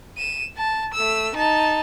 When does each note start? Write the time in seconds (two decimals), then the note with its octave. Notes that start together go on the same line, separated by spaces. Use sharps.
0.18 D#7 E7
0.57 A5
0.94 A3 E6
1.34 D#4 A5